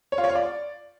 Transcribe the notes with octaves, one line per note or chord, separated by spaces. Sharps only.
C#5
F4
C#5
F4
D5